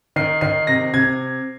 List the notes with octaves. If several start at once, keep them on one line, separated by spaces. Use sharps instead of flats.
D#3 C7
D#3 C7
C3 A#6
C3 G#6